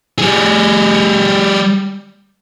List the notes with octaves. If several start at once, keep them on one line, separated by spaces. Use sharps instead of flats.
G3 G#4